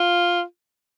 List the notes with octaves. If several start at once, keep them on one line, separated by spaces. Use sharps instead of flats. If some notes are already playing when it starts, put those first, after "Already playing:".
Already playing: F4